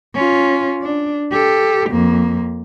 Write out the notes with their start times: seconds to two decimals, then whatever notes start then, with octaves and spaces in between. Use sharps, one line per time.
0.15 C#4 F4
0.83 D4
1.31 G4 A4
1.90 F2 A#3